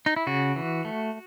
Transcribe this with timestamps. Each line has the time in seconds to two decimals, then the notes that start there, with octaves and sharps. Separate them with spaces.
0.06 D#4
0.16 E4
0.27 C#3 F#4
0.56 E3
0.85 A3